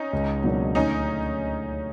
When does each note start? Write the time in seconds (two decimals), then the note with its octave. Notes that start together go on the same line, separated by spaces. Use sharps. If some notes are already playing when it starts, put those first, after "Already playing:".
Already playing: C#4 D#4
0.13 C#2
0.44 B2 F#3 A#3 D4
0.75 D2 C#4 D#4